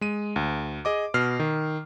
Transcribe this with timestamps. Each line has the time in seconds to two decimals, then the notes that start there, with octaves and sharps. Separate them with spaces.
0.01 G#3 D#7
0.36 D2
0.85 G#4 D#5 D6
1.14 B2 F6 C7
1.39 D#3